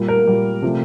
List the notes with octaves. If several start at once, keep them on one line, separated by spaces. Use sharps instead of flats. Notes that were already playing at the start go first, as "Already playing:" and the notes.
Already playing: A#2 G3 A#3
A#4
A#2 G3 A#3
C3 F3 A3